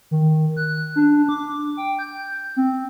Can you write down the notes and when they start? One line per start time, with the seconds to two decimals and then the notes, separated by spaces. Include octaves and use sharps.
0.11 D#3
0.57 F#6
0.96 D4
1.29 D6
1.77 G5
1.99 G6
2.56 C4